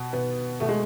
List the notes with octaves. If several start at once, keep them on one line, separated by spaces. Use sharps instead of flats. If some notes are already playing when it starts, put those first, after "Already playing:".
Already playing: B2
B2 B3
B2 A3
G#3